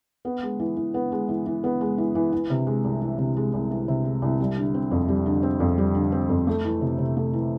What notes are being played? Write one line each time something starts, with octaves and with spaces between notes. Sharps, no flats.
B3
G#3
E3
E3
B3
G#3
E3
E3
B3
G#3
E3
E3
E3
C3
G#3
C2
E3
C3
G#3
C2
E3
C3
G#3
C2
G3
D3
C4
F2
G3
D3
C4
F2
G3
D3
C4
F2
A3
E3
C3
C3
A3
E3